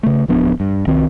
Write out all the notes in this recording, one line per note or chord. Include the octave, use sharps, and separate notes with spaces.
C#3 A3
D1 F3 B3 D4
G2
C2 D#3 C4